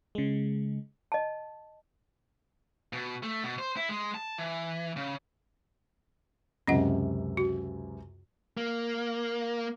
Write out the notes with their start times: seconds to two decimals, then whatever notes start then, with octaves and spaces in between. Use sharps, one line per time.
0.15 C#3 G#3
1.12 D#5 A5
2.93 B2
3.23 A3
3.44 B2
3.59 C5
3.77 E4
3.89 G#3
4.14 A5
4.38 E3
4.97 C#3
6.68 C#2 F#2 C3 C#4 D#5 F#5
7.37 F#4
8.57 A#3